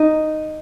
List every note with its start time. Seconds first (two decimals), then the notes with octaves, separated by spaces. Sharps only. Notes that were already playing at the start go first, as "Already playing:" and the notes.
Already playing: D#4